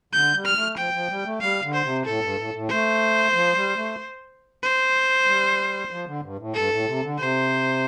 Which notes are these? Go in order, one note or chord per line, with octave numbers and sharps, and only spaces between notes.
D3 G6
G3
F6
A3
F3 G5
F3
G3
A3
G3 F5
D3
C5
C3
A2 A4
G2
A2
A2
A3 C5
F3
G3
A3
C5
G3
F3
D3
G2
A2
G2 A4
A2
C3
D3
C3 C5